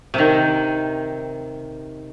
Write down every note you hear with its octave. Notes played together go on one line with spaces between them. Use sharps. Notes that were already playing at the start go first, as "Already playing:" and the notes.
C3 D#3